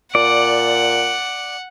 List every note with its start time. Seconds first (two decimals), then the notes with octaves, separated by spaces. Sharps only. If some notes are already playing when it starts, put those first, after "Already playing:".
0.15 A#2 D5 F#5